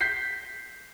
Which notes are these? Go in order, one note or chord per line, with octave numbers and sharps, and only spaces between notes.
G6 B6 C7